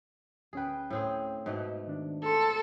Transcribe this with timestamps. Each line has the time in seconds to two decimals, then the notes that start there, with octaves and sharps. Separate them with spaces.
0.53 D2 C#4 G#4 B4 G5
0.90 A2 C4 G#4
1.46 G#2 B2 A3
1.87 D#3 D4
2.24 G#4 A4 C6